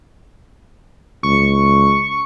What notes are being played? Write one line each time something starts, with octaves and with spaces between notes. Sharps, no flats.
C#2 C#6